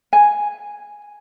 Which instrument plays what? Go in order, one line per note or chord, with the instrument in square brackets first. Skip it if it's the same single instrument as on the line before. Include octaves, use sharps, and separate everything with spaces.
[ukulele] G#5